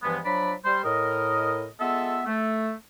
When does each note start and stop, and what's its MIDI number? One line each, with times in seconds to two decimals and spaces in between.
0.03 0.18 43
0.03 0.18 52
0.03 0.18 53
0.03 0.18 56
0.03 0.18 59
0.25 0.52 53
0.25 0.52 54
0.25 0.52 62
0.25 0.52 74
0.25 0.52 83
0.65 0.80 55
0.65 0.80 72
0.84 1.66 45
0.84 1.66 70
0.84 1.66 75
1.80 2.21 56
1.80 2.21 59
1.80 2.21 65
1.80 2.21 69
1.80 2.21 76
2.26 2.72 57